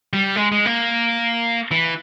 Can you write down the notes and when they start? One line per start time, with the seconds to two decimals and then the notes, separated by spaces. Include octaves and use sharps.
0.13 G3
0.36 G#3
0.52 G#3
0.66 A#3
1.71 E3